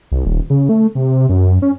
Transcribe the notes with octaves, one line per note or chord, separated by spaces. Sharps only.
C2
D#1
C#3
A3
C3
F#2
C#4